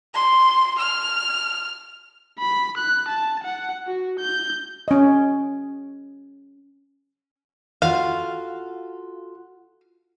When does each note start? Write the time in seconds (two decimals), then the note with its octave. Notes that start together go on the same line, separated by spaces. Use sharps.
0.14 C6
0.79 F6
2.39 B5
2.78 F#6
3.08 A5
3.44 F#5
3.87 F#4
4.19 G6
4.88 C#4 D#5
7.82 F4 F#4 A4 F5